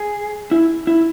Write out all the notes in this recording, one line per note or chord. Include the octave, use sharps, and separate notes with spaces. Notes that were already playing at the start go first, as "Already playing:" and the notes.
Already playing: G#4
E4
E4